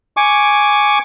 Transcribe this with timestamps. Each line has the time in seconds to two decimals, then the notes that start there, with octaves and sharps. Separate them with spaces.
0.17 G#5 C#6 D6